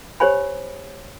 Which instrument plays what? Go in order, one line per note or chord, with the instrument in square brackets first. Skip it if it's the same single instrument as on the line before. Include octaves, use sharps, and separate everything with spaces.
[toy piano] G4 C5 C#5 G#5 B5